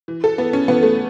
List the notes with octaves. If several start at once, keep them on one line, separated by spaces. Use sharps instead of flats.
E3
A4
E3 B3
C#4
E3 B3
A3